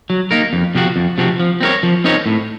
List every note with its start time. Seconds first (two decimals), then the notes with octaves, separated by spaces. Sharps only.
0.10 F#3
0.31 A#3 D#4 A#4
0.53 F2
0.75 C3 F3 C4 F#4
0.96 F2
1.18 C3 F3 C4 F#4
1.40 F3
1.61 C4 D#4 A#4 C#5
1.83 F3
2.04 C4 D#4 A#4 C#5
2.26 A2